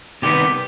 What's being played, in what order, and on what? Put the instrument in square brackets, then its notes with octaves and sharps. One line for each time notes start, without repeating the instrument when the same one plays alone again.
[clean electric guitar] C3 D#3 G3 B3 G4